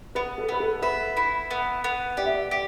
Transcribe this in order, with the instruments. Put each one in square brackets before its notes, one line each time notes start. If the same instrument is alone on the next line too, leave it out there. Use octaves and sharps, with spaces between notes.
[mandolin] B3 [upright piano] B4
[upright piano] A4
[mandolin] B3 [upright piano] B4
[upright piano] A4
[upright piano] B4 [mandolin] E5
[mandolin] E4
B3
B3
[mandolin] G4 [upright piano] D5
[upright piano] E5
D5
[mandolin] G4